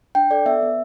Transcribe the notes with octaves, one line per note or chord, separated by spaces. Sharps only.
D4 G5
A4 D5
B3 E5
B3